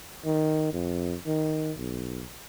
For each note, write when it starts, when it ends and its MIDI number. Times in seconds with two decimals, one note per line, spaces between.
0.25 0.69 51
0.73 1.15 41
1.26 1.72 51
1.77 2.25 35